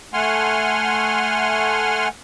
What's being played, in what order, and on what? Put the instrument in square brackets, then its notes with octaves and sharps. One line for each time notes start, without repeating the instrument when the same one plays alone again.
[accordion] A3 F#5 G#5 C6 F6